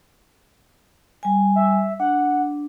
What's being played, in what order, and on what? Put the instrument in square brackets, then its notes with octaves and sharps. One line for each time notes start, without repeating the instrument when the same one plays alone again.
[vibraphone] G3 G#5
[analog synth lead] E5
[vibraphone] D4 [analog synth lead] F#5